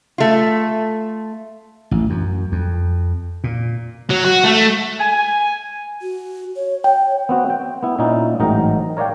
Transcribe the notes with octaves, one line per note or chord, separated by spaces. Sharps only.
A3 F4
A1
F#2
F2
A#2
F#3
F#4
A3
G#5
F#4
C#5
C#5 G5
B3 C4 F#4
G5
B3 E4
A#2 A#3 C#4 D#4 E4
A1 G#2 F#3 D#4 A#4 G5
A#4 C#5 D5 F5 G5